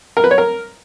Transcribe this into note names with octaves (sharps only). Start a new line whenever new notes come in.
A#4
B4
C#5
A#4